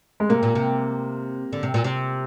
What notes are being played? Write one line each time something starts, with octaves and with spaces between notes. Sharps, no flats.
G#3
C3 A#3
A#2
C3
D3
C3
A#2
C3